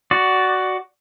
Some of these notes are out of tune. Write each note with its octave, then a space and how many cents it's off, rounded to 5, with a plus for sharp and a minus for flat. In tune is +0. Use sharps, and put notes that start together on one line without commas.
F#4 +10 D5 +0